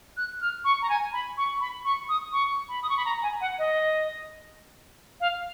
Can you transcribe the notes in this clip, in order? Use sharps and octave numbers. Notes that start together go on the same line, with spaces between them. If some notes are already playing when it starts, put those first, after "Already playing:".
F#6
F6
C#6
A#5
G#5
B5
C#6
B5
C#6
D#6
C#6
B5
D#6
C#6
B5
A#5
G#5
F#5
D#5
F5